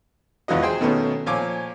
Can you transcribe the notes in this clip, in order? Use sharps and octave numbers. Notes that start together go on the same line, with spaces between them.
G#1 E2 E3 F4 F#4 D#5
G#4 C5 G5
B2 D#3 A3 B3 C#4
A#2 F3 C#5 G#5 D6